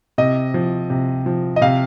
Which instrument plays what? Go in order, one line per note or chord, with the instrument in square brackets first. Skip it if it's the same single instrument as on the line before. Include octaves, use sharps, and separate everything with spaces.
[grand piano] C3 D#5
F3
C3
F3
D#5
C3 F5